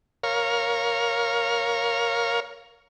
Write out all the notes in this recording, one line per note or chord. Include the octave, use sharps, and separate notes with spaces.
A#4 C#5 F5